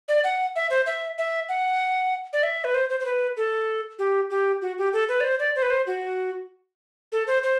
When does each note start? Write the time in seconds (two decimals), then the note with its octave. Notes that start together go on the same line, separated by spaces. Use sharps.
0.08 D5
0.24 F#5
0.56 E5
0.70 C5
0.86 E5
1.18 E5
1.49 F#5
2.33 D5
2.43 E5
2.64 B4
2.74 C5
2.90 C5
3.00 C5
3.05 B4
3.37 A4
3.99 G4
4.30 G4
4.62 F#4
4.78 G4
4.93 A4
5.09 B4
5.20 D5
5.24 C5
5.39 D5
5.55 C5
5.62 B4
5.70 C5
5.87 F#4
7.12 A4
7.27 C5
7.43 C5